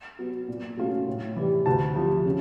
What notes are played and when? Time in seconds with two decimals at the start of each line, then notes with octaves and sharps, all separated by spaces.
0.19 F#3 B3
0.48 A#2
0.77 F#3 A3 C#4 F4
1.08 A2
1.37 E3 G3
1.66 D2 A5
1.96 C3 F3
2.25 C#3